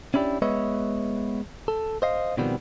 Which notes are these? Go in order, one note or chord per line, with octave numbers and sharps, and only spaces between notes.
C#4 D4 E4 G4 D5
G#3 B3 B4 C#5 D#5 E5
A4
C5 D#5 F5
B2 D#3 F3 G3 B3 C4